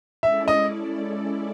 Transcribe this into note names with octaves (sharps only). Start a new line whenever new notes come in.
G#3 C#4 E4 A4 D5 E5
D#5